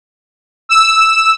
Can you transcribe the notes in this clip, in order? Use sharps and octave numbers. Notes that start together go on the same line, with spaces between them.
E6